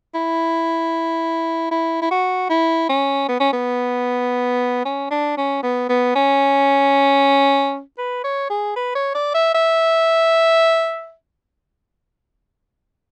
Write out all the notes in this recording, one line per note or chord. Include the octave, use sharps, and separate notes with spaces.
E4
E4
E4
F#4
E4
C#4
B3
C#4
B3
C#4
D4
C#4
B3
B3
C#4
B4
C#5
G#4
B4
C#5
D5
E5
E5